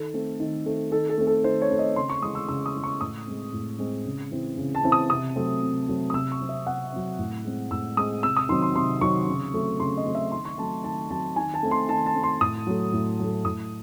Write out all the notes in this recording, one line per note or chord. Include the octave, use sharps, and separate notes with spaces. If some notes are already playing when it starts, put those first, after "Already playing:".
Already playing: D#3 A4
A3 C4
D#3
A3 C4
D#3 A4
A4
A3 C4
A4
D#3 C5
C#5
A3 C4
D#5
C#3 C6
C#6
E3 G#3 D#6
E6
C#3 E6
D#6
E3 G#3
C#6
A2 D#6
G#3 C4
A2
G#3 C4
C#3
E3 C4
C#3
A5
E3 C4
D#6
C3 D#6
F#3 A3 C4
C3
F#3 A3 C4
D#6
C3 E6
C#6
F#3 C4
E5
C3 F#5
F#3 C4
A2
G#3 C4
A2 E6
G#3 C4 D#6
C3 E6
D#6
D#3 F#3 C4 C6
C6
C3 C6
D#3 F#3 C4 C#6
C#3
F#3 A3 C4
C#3 C6
D#5
F#3 A3 C4
E5
D#3 C6
C#6
F#3 A3 C4 A5
D#3 A5
F#3 A3 C4 A5
D#3 G#5
A5
A3 C4
C6
D#3 A5
A5
A3 C4
C6
A2 D#6
F#3 A3
A2
F#3 A3
A2 D#6